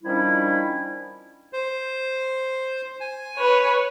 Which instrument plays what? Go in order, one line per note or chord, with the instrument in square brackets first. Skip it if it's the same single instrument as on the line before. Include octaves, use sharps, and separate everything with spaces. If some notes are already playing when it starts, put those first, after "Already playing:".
[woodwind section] D#3 F3 G3 C#4 D4 E4
[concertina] C5
G#5
[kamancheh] B4 C#5